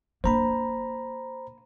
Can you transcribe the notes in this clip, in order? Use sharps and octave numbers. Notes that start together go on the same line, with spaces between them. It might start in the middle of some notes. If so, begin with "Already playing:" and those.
A#3 D4 C5 A#5 B5